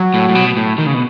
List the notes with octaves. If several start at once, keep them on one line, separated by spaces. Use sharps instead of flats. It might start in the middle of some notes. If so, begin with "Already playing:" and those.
Already playing: F#3
A2
A2
B2
A2
D#3
C#3
B2